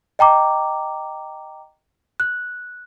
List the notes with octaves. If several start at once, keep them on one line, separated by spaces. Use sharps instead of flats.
D#5 G5 A#5 D6
F#6